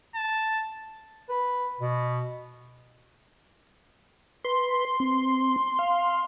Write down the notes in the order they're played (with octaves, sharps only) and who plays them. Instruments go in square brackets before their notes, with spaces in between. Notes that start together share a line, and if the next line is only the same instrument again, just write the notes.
[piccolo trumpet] A5
[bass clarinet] B4
B2
[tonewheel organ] B4 [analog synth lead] C6
[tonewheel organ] C4
F5